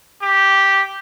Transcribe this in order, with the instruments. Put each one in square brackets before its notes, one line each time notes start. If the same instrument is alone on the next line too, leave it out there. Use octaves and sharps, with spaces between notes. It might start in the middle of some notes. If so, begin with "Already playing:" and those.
[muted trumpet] G4